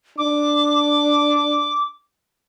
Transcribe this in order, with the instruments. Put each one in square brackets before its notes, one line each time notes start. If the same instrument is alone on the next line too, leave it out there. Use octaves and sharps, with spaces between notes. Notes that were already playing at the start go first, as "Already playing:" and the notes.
[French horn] D4 [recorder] D6